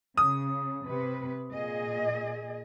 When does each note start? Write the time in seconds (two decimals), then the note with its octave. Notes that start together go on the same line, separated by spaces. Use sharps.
0.17 C#3 D#6
0.87 C3 B4
1.52 A#2 G#4 D#5